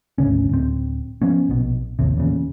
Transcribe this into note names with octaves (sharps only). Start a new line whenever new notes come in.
G#1 D2 C#3 C#4
D1 C4
F3 B3 C#4
A#1 B2
A1 D#2 C3
E2 A#2 C#3